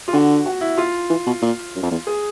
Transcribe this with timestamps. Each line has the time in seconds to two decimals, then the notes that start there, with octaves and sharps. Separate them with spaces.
0.08 F4
0.13 D3 F#4
0.46 F#4
0.61 E4
0.78 F4
1.10 E3
1.27 B2
1.42 A#2
1.75 F#2
1.83 F2
1.91 E2
2.07 G#4